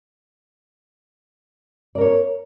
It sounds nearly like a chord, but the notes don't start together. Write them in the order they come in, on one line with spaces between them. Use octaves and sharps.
D5 A#4 C#5